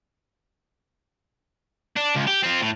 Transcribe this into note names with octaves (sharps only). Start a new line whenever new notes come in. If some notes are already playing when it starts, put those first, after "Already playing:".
D4
C#2
G4
C4 F4
A2